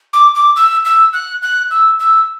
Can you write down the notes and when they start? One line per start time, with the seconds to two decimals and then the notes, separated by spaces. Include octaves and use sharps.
0.13 D6
0.35 D6
0.56 E6
0.85 E6
1.13 F#6
1.42 F#6
1.71 E6
2.00 E6